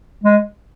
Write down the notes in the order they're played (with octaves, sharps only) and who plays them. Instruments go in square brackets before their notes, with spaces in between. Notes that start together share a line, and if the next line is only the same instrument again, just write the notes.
[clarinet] G#3